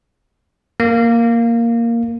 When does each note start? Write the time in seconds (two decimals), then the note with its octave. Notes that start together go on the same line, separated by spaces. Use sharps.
0.80 A#3